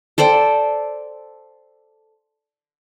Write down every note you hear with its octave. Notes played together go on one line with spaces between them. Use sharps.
A4 C5 D5 G5